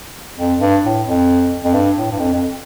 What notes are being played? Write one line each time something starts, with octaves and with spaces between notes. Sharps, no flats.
F2
G2
A2
F2
F2
G2
A2
G2
F2
F2